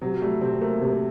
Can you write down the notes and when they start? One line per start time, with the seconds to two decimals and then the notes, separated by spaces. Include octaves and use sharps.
0.02 C3 F#3
0.21 G3 A3
0.41 C3 C4
0.61 A3 A#3
0.82 C3